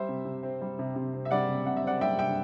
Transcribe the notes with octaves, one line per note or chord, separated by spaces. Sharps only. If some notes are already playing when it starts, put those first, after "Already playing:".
Already playing: G3 C5 E5
C3
C3
C4
G3
C3
C3
C4
E5
G3 D5 F#5
C3
C3 F#5
E5
C4 D5 F#5
G3 E5 G5
C3 E5 G5